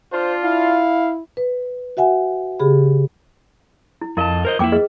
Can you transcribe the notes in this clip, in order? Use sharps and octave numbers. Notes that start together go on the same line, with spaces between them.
D4 F4 C5
E4 F5
B4
F#4 E5 F#5 G#5
C#3 G4 G#4 B5
E4
F2 E4 A#4 D#5 F5 A5
A#4 C5 D#5
F2 A#3 E4 G5 D6
G#4 B4 D#5